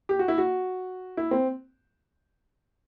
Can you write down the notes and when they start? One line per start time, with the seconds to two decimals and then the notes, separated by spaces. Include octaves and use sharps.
0.09 G4
0.19 F#4
0.28 E4
0.38 F#4
1.17 E4
1.31 C4